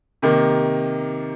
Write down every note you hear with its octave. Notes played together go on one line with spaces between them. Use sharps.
C3 D#3 A#3